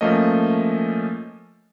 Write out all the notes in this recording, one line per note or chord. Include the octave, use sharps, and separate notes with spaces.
F3 A3 A#3 C#4 D#5